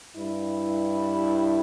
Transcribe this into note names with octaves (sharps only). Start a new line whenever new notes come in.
G2 E4